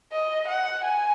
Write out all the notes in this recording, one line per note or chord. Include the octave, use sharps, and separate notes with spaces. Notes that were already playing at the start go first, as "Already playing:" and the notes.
D#5
F#5
G#5